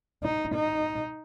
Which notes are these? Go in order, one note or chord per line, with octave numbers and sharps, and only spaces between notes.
D#4
D#4